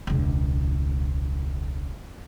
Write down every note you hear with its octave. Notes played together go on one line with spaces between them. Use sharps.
E1 C#2